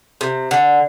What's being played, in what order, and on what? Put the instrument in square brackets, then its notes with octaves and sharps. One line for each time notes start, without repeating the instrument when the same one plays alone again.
[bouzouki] C3
D3